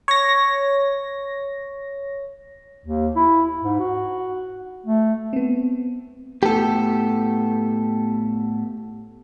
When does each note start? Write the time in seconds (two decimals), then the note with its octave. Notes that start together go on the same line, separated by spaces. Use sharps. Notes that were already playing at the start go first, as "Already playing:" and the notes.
0.08 C#5 A#6
2.86 D#2
3.16 E4
3.62 G#2
3.79 F#4
4.86 A3
5.33 B3 C4
6.43 A2 B3 G4 A4